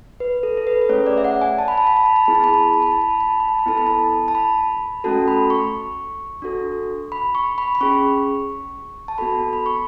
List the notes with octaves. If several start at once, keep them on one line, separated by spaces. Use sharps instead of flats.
B4
A4
A4
B4
B4
A3 C#4 G#4 C#5
D5
E5
F#5
G#5
A5
B5
A5
B5
A5
B5
A5
B3 E4 G#4 B5
A5
B5
A5
B5
A5
B5
A5
B5
A5
B5
A5
B5
A5
B5
B3 E4 A4 A5
B5
A5
A5
B5
A3 C#4 F#4 A4 A5
B5
C#6
D4 F#4 A4
B5
C#6
B5
B5
C#4 G#4 C#6
A5
B3 F#4 A4 B5
B5
C#6